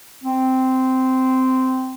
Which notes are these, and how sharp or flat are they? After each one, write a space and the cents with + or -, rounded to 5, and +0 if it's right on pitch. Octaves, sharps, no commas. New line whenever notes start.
C4 -10